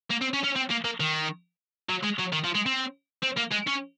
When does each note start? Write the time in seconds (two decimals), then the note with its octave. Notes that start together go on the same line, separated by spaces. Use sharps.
0.11 A#3
0.22 C4
0.34 C#4
0.44 C#4
0.55 C4
0.70 A#3
0.84 A#3
1.00 D#3
1.89 F#3
2.03 G#3
2.19 F#3
2.32 D#3
2.44 F3
2.55 G#3
2.66 C4
3.23 C4
3.37 A#3
3.51 G#3
3.67 C#4